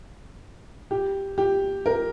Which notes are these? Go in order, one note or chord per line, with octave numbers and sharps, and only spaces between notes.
G4
G4
A#4